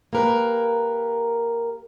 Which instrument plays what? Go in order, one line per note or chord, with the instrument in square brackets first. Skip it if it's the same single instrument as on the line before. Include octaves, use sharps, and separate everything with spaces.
[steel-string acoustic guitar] A#3 G4 A#4 B4